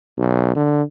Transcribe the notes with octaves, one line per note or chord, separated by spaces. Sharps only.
B1
D3